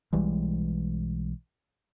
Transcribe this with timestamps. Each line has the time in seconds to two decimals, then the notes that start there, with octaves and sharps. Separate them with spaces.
0.13 B1 E3 G3 G#3